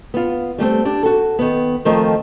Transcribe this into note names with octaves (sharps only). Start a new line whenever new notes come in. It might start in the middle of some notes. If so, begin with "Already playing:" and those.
B3 F4
G3 A3 A#3 C4
D4 G4
F#4 A4
D#3 B3
D#3 F3 A3 C4 A#4 D#5